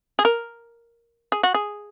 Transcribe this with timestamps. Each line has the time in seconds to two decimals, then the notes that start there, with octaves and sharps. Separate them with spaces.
0.19 G#4
0.25 A#4
1.32 G#4
1.43 F#4
1.54 G#4